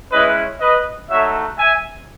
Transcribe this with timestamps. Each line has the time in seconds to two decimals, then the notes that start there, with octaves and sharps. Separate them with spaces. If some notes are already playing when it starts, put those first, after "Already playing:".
0.11 G#3 C#4 E4 B4 D#5
0.60 B4 D#5
1.09 A3 D#4 F#4 C#5 E5
1.58 E5 G#5